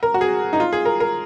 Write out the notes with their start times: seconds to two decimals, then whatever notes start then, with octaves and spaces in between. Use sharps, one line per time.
0.03 A#4
0.14 F#4
0.21 G#4
0.53 D#4
0.60 F4
0.73 G#4
0.85 A#4
1.00 A#4